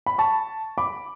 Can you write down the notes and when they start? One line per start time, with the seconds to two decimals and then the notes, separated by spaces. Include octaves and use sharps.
0.06 B5
0.18 A5 C#6
0.78 B5 D6